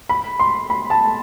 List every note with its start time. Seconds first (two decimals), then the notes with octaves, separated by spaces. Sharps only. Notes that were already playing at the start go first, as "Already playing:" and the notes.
0.09 B5
0.40 C6
0.70 B5
0.90 A5